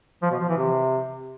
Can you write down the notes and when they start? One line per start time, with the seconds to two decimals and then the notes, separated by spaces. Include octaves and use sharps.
0.22 F3
0.31 B2
0.40 F3
0.49 E3
0.57 C3